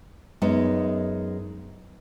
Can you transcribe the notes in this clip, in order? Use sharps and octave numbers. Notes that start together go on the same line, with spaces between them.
F#2 G#3 B3 D#4